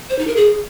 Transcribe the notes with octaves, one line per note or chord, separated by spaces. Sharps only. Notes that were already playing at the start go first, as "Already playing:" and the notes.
C5
D#4
A#4
G#4